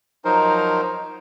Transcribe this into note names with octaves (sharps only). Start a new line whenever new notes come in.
F3 F#3 D#4 A#4 C5